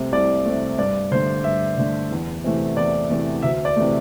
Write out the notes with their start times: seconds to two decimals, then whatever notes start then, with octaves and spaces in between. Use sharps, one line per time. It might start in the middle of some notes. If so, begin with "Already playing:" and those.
Already playing: C2 C3 A3
0.12 C2 D5
0.45 C3 A3
0.79 G2 D5
1.11 D3 A3 C5
1.44 G2 E5
1.78 D3 A3
2.11 E2
2.44 C3 E3 A3
2.77 E2 D5
3.10 C3 E3 A3
3.42 D2 E5
3.65 D5
3.76 C3 E3 A3